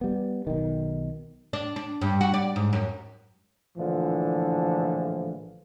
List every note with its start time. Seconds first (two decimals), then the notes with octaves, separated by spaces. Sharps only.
0.01 G3 B3
0.47 B1 D#3
1.53 D4
1.76 D4
2.01 G2
2.21 F#4
2.34 D5
2.56 G#2
2.73 F#2
3.78 A#1 A2 D3 E3 F3